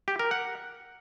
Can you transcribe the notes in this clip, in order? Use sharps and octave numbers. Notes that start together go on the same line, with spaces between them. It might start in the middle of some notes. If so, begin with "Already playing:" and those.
G4
A#4
F#5